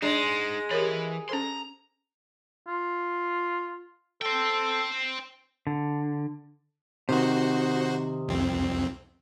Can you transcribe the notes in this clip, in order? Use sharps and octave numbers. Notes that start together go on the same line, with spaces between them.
G#3 D4 D#4 C5 D5
E3 G4 A#4 C#5 B5
C#4 A4 C5 A#5 C6
F4
A4 C5 G5
D3
C3 D#3 F#4 C5
C2 F2 C4